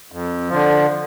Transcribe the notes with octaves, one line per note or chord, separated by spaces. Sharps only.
F2
D3 F3